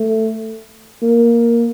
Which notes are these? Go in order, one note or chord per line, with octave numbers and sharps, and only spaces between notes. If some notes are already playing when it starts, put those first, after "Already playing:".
Already playing: A3
A#3